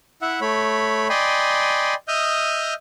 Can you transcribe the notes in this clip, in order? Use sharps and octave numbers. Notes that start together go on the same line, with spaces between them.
E4 E5 F#5
A3 C#5 B5
D5 D#5 G5 G#5 B5 C6
D#5 E5 D#6 F6 G6